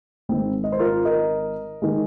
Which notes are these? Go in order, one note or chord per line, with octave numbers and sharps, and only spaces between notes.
G#1 G#2 D#3 G#3 C4
D#5
C5
F4 A#4
A#4 D#5
D#3 G#3